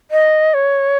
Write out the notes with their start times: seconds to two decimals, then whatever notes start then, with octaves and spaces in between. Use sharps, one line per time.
0.11 D#5
0.54 C#5